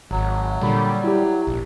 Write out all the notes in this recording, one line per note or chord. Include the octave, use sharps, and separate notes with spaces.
G#1 F#3
A#2 D3 G3 B5
E4 G4
A#1